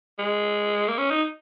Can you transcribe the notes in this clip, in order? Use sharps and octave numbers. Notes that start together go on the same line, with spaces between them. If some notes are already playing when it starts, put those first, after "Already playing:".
G#3
A#3
C#4
D#4